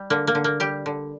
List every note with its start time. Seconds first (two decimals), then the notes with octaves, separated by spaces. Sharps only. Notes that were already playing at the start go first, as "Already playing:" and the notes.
Already playing: G3
0.10 D3 A#3
0.27 A#3
0.35 D3
0.44 A#3
0.60 G3 G4
0.86 D3